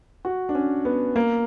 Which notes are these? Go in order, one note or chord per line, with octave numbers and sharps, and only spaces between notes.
F#4
D4
C#4
B3
A#3